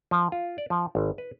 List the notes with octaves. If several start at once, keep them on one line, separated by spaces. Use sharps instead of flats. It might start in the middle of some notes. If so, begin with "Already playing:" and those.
F3
F4
D5
F3
G#1
B4